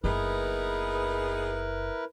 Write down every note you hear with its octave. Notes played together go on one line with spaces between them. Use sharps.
F#1 B3 D#4 E4 G#4 A#4 B4